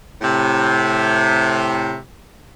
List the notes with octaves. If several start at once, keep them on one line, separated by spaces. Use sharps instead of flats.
A2 C3